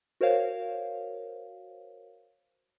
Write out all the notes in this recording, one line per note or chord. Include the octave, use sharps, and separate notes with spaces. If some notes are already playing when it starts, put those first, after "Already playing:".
F#4 A#4 C5 C#5 F5